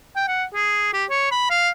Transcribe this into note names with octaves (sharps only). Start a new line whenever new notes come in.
G5
F#5
G#4
G4
C#5
B5
F5